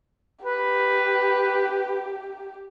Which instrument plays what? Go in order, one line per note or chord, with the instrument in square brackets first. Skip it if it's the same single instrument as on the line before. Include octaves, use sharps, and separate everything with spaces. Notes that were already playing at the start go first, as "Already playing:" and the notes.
[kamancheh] G4 [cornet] B4